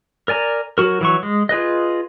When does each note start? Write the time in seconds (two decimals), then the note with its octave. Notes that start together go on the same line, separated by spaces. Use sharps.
0.28 A#4 D5 G#5 A#5
0.78 F#3 F#4 A#4
1.01 E3 F#3 C#6
1.23 G#3
1.49 F4 G#4 B4 D#5